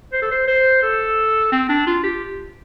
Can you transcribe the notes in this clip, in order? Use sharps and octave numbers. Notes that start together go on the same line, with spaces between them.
C5
A4
C5
C5
A4
C4
D4
F4
G4